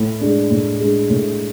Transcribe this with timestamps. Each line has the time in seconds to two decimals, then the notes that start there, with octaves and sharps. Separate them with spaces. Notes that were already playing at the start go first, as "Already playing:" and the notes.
Already playing: A2
0.21 G#3 D4
0.51 A2
0.80 G#3 D4
1.10 A2